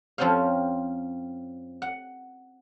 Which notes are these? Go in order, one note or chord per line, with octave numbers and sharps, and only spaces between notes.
F2 F3 C4 C#4 C5 F5
F#5